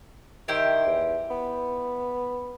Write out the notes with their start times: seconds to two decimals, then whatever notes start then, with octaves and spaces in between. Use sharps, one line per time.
0.48 D#3 E4 G4 C5
0.87 E2
1.31 B3